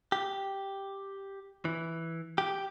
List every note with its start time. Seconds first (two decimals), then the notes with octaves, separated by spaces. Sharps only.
0.12 G4
1.65 E3
2.38 G4